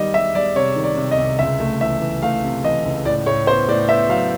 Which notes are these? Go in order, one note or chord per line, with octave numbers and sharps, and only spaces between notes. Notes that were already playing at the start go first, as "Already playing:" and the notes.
Already playing: D#3 G3 D#5
G3 E5
G3 D5
C3 C#5
D#3
D5
C3
D#5
C2
C#2 E5
A3
E3 E5
E3
A3 F5
C3
E3 D#5
C#2
A2 D5
A2 C#5
B3 C5
A2 D5
B3 E5
F#3 F5